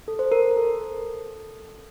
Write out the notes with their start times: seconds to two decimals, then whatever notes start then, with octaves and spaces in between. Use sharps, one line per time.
0.08 A4
0.19 C5
0.32 A#4
0.57 A4